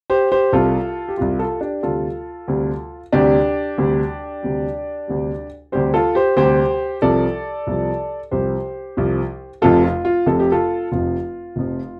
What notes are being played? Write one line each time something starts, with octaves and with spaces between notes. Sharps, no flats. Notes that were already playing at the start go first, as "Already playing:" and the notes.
G4 C5
G4 C5
C2 C3 G3 F4 A4
G4
C2 C3 G3 F4
F4 A4
D4 G4
D2 C3 G3 F4 A4
D2 C3 G3
D2 C3 G3 D4 G4
D2 C3 G3
D2 C3 G3
D2 C3 G3
D2 C3 G3 G4 C5
F4 A4
G4 C5
D2 C3 G3 G4 C5
C2 C3 F3 A4 D5
C2 C3 F3
C2 C3 F3 G4 C5
C2 C3 F3
F1 F2 C3 F3 F4 A4
F4
F4
F1 F2 C3 F3 A4
G4
F4 A4
F1 F2 C3 F3 F4
F1 F2 C3 F3